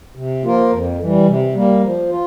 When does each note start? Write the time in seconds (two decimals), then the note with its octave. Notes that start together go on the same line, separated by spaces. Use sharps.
0.15 C3
0.44 F3 A#3 F4 A#4
0.71 F2
0.99 E3 G3
1.26 C3
1.54 G3 A#3
1.83 F3
2.09 F4